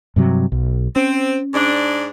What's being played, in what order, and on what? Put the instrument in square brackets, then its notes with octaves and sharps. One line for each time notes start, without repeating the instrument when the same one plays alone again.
[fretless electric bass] G2 C3 F#3
B1
[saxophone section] C4 [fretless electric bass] C#4
[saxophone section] G#2 D4